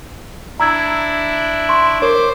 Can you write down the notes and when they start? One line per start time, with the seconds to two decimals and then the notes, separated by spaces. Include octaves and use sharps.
0.60 D4 E4 A#5 E6 G#6
1.69 C6 C#6
2.01 A#4 C5 C#5 C#6 D6